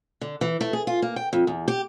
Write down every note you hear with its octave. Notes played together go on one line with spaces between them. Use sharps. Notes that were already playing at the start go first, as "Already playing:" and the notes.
D3
E3
A3
G#4
F4
A#3
G5
F2
E2
G4